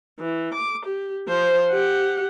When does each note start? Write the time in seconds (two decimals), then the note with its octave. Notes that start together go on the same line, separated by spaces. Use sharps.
0.20 E3
0.54 D6
0.85 G4
1.28 F3 C5
1.70 G4 F#5